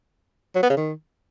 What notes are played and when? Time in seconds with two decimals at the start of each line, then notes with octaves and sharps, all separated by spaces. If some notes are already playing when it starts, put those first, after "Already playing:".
0.55 F#3
0.62 B3
0.70 C#3
0.77 D#3